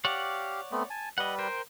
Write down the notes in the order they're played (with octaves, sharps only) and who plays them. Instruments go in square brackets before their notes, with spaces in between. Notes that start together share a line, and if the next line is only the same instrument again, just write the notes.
[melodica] G4 F5 [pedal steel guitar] C#5 D5 F#5
[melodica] A3 B3 C4
G#5 A5
[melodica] G3 B4 [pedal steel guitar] D#5 F#5
[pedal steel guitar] A#4 C5 G5